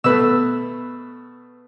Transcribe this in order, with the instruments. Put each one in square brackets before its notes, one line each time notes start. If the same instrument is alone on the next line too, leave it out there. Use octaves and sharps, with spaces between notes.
[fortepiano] B2 A3 [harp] B4 E6